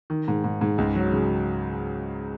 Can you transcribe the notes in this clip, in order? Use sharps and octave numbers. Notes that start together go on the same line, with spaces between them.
D#3
G#2
G#2
G#2
C#2
F#3
C#3